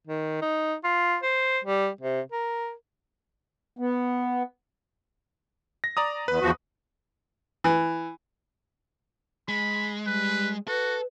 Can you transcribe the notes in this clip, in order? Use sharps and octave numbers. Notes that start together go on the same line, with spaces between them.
D#3
D#4
F4
C5
G3
C3
A#4
B3
A#6
D5 A#5 D#6
E2 B4
E2 F3 F#4
E3
G#3 B5
G3 B4
F#4 A4 B4